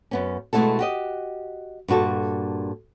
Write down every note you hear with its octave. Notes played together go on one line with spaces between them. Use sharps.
F#2 B3 C#4
B2 G#3 A3 E4 F#4 A4
F#4 G4 D#5
G2 A#2 F#4 A4